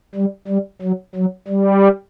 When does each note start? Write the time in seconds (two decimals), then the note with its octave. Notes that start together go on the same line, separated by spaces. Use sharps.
0.15 G3
0.48 G3
0.82 F#3
1.15 F#3
1.48 G3